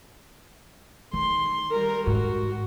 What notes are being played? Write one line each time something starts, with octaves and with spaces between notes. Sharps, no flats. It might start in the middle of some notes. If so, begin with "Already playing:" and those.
D#3 C6
G3 A#4
G#2 F#4